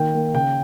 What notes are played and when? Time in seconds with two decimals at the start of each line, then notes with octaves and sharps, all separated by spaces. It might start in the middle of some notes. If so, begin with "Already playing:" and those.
Already playing: D#3 A#3 G5
0.14 A#3
0.34 C#3 G5